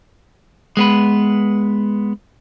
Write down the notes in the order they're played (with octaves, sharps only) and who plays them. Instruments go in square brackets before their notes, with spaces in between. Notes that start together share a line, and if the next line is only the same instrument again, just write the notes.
[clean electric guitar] G#3 B3 B4